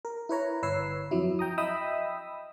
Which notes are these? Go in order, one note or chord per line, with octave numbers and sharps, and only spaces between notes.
A#4
E4 B4 C#5 A#5
G1 B4 C#5 E6 C7
F2 F#3 E4
G5 A#5 D#6
D#5 E5 G5 B5 D#6 E6